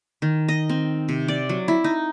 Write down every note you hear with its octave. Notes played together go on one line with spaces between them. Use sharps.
D#3
D#5
C4
C3
D5
F#3
E4
D#4